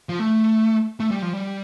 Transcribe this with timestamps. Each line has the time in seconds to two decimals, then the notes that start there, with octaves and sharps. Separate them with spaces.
0.09 F3
0.19 A3
1.00 A3
1.11 G3
1.22 F3
1.33 G3